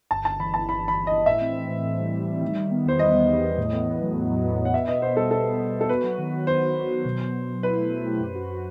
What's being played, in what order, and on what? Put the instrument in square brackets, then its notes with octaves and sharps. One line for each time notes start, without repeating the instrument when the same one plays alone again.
[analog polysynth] G1 [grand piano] A5
[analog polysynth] G1 [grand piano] A5
[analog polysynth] E3 [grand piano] B5
[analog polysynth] G1 [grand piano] A5
[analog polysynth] G1 [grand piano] B5
[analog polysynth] G1 [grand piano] B5
[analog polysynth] G1
[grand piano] D#5
[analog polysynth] E3
[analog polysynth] A2 [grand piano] E5
[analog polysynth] C4
C4
A2
A2
G3
A2
G3
D#3
D#3
B3
[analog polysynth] E2 [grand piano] C5
[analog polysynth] B3 [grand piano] D#5
[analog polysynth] G3
E2
E2
A2
B3
A2
F#3
B3
F#3
B3
B3
[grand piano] F#5
[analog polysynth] B3 [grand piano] E5
[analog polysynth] B2 [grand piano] D#5
[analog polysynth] B2 [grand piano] C5
[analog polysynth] G3 [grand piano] A4
[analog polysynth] B3 [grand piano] A4
[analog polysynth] B3
B2
B3
[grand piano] A4
[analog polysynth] F#4 [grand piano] B4
[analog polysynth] F#3
D#3
F#3
[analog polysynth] F#4 [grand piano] C5
[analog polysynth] F#3
F#3
F#3
B2
B2
B2
B2
[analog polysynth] E4 [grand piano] B4
[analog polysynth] A3
A3
G4
F#2
F#4